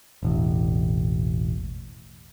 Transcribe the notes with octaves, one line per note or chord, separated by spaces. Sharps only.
E1 A1